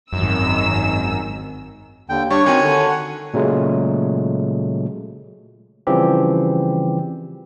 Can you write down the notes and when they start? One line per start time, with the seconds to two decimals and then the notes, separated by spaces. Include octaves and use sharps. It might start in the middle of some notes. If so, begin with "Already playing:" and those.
0.13 G#1 F#2 D#3 E6
2.09 D#2 D3 G5
2.30 G3 D4 C#5 C#6
2.46 D#3 C4 F#4 G#5
2.62 D3
2.88 F#5
3.34 A#2 C#3 F#3 G#3 A3
5.87 C#3 E3 F3 G3 C4 G4